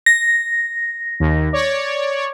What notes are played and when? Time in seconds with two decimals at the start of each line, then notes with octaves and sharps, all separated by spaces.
0.06 A#6
1.20 D#2
1.53 C#5 D5